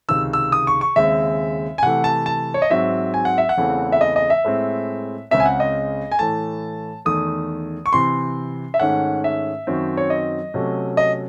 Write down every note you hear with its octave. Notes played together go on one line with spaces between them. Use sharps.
C#2 C3 D#3 E6
E6
D#6
C#6
C#6
D#2 C#3 G#3 C4 E5
G#5
C3 E3 A3 F#5
A5
A5
C#5
D#5
G#2 F#3 C4 E5
G#5
F#5
E5
F#5
E2 C#3 E3 A3 C4
E5
D#5
D#5
E5
A2 G#3 C4
C#2 C#3 G#3 C4 E5
G#5
F#5
D#5
G#5
A2 E3 A3 A5
E2 D#3 A3 D#6
C#6
C3 E3 C4 C6
E5
G#2 D#3 A3 C#4 F#5
E5
F#2 D#3 F#3 C4
C#5
D#5
C3 F#3 A3 C#4
D#5